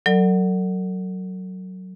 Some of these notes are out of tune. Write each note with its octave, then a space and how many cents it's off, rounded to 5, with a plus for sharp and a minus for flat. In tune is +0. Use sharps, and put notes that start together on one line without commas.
F#3 +10 A4 +45 D5 +25